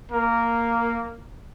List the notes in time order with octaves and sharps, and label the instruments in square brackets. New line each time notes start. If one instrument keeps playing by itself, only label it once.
[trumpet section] A#3 A#4